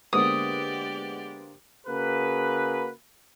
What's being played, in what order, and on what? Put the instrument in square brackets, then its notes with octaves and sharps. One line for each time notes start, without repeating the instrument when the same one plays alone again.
[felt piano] D3 A#3 C5 [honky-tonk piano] G#3 B3 [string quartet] G4 D5 [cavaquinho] D#6
[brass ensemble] C#3 A#3 F#4 G#4 B4